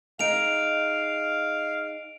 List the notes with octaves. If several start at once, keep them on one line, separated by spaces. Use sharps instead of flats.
D#4 G#4 F5 D7 F7